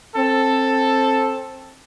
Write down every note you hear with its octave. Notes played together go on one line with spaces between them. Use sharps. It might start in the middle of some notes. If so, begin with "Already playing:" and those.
C4 A4